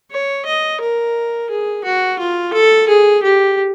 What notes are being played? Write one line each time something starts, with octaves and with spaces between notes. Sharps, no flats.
C#5
D#5
A#4
G#4
F#4
F4
A4
G#4
G4